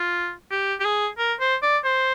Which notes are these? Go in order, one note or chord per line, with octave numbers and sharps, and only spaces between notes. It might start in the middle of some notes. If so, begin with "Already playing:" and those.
Already playing: F4
G4
G4
G#4
A#4
C5
D5
C5